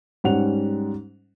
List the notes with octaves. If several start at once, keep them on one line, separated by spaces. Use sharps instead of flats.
G#2 G3 C#4 F#5 F7